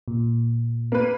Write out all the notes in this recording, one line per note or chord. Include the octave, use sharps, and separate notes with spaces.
A#2
A#3 B4